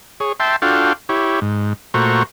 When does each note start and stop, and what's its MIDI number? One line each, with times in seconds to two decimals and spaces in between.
0.20 0.32 68
0.20 0.32 73
0.40 0.56 76
0.40 0.56 79
0.40 0.56 81
0.40 0.56 84
0.62 0.93 62
0.62 0.93 65
0.62 0.93 66
0.62 0.93 69
0.62 0.93 77
0.62 0.93 79
1.09 1.40 64
1.09 1.40 67
1.09 1.40 73
1.41 1.73 44
1.94 2.23 46
1.94 2.23 57
1.94 2.23 66
1.94 2.23 72
1.94 2.23 82
1.94 2.23 85